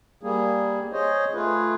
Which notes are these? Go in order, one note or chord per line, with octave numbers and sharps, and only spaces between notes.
G3 A#3 G#4
G#4 C5 C#5 D#5
A3 F4 G#4 B4